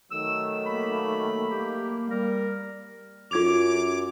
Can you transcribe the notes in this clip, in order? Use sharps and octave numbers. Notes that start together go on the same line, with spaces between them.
D#3 F#3 A3 E6
A#3 B5
A#3 G4
G3 A#4
F#2 F4 D6 G#6 F7